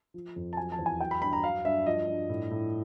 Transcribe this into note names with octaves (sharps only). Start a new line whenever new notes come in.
F3
F2
A5
F#3 G#5
A5
E2
G#5
F#3 G5
B5
G2 B5
A#5
F#3 F5
G2 E5
F3 D#5
G2
A2
A2